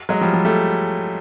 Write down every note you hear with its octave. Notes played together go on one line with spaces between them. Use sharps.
F#3 G#3
F3 G3
F3 G3
G3 A3